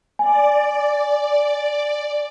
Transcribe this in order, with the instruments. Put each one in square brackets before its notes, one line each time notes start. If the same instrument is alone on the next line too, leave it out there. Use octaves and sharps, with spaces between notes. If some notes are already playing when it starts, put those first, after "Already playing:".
[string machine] D5 [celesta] G#5